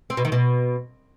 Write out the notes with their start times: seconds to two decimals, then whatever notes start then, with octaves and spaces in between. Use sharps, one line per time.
0.10 C4
0.17 B2
0.25 D#3
0.32 B2